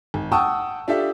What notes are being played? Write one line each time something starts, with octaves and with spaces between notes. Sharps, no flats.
G#1
F#5 G5 A5 C#6 D#6 E6
D4 F4 G4 A4 D5 E5